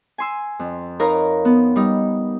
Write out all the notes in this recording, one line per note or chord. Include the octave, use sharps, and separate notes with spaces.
G#5 C6 E6
F2
D#4 A#4 B4 C#5 F5 A#5
B3
G3 D#4